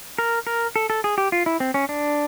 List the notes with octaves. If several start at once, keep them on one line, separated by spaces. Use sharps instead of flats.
A#4
A#4
A4
A4
G#4
G4
F4
E4
C4
C#4
D4